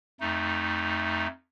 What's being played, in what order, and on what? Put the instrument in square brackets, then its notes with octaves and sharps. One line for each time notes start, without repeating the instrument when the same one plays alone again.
[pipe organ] F2 A3 D#4